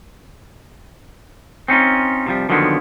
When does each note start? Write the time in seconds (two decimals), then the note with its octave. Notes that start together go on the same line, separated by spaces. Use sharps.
1.68 C4 C#4 D#4 F4
2.26 C3 F3 G3
2.49 D3 D#3 F3 F#3 A#3 B3